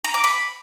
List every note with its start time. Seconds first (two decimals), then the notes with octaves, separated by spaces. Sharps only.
0.04 A#5
0.14 D6
0.24 B5